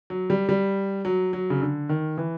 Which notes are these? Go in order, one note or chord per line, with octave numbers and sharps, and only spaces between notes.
F#3
G3
G3
F#3
F#3
C#3
D3
D#3
E3